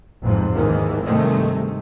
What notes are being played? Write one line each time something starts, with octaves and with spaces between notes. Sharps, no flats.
A1 F2 G#2 C3
D#2 G#2 D#3 E3
G2 C3 D#3 G#3 A3